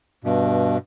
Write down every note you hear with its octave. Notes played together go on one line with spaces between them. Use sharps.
G2 B2